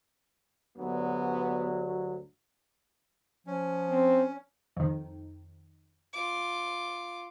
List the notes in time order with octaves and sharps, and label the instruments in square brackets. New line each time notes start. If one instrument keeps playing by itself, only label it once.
[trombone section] D2 G2 F#3 [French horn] B3
[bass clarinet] F3 [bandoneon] C#4
[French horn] C4
[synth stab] F2 D#3
[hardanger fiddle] F4 D6